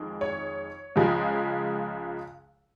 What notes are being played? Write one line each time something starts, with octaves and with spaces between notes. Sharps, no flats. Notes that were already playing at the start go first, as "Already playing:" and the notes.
Already playing: F2 D#3 G#3
C#5
C#2 C#3 F3 G#3